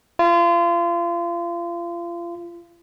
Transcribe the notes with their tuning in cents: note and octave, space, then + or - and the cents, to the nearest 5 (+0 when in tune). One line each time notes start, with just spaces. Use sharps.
F4 -30